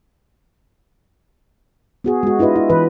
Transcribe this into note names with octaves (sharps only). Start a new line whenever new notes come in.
B3 F#4 G#4
G#3 F#4
D4 E4 F4 B4 D#5
E4
E3 B4